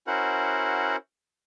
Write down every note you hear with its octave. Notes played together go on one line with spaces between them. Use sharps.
C#4 E4 F#4 A#4 C5 F#5